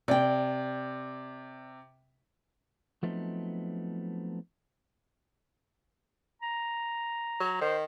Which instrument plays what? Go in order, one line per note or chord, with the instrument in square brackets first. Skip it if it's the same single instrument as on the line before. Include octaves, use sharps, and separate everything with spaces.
[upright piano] C3 [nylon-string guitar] D5 G5
[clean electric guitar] F3 F#3 A3 B3 C4 D#4
[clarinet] A#5
[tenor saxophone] F#3
[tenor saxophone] D#3 [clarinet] C5